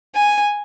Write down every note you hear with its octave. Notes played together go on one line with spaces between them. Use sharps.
G#5